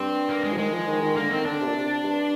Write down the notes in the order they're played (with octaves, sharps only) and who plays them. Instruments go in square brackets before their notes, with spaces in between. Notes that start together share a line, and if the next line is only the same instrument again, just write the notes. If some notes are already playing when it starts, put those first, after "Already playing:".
Already playing: [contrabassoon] G2 [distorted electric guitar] C4
[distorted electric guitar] A#3
G#3
[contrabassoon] F3
[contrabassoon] D#3 [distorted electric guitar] G#3
[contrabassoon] F3
D#3
D#3
[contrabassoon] D3 [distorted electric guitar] A#3
[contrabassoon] D#3 [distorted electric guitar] C4
[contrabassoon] D3 [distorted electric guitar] D4
[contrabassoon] C3
A#2
C3
G2